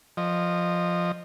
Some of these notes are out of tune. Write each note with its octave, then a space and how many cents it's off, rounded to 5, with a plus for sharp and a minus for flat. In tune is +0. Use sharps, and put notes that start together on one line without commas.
F3 +0 D#5 -20